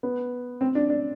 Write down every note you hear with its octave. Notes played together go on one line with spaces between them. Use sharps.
B3
C4
D4
D4